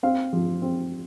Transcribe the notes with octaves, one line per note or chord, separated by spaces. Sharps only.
C4 F5
F3
C4